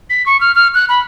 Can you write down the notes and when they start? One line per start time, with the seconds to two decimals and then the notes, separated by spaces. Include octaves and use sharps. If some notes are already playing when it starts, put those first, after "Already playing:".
0.10 B6
0.26 C#6
0.41 F6
0.55 F6
0.74 F#6
0.89 B5